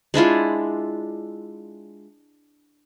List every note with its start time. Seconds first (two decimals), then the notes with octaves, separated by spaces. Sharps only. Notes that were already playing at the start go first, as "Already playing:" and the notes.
0.14 G#3 D4 E4 F4